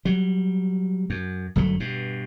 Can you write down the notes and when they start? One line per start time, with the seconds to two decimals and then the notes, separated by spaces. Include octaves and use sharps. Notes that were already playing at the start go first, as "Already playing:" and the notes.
0.05 F#3 G3
1.10 F#2
1.56 G1 F#2 F#3 A3
1.80 G2 B2